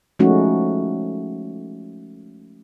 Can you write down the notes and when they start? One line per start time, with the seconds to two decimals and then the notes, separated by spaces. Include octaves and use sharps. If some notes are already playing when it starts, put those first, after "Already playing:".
0.19 F3 G#3 A3 C#4 D#4 F#4